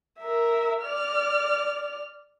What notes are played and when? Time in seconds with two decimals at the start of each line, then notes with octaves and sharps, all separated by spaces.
0.19 A#4 E5
0.82 D5 F6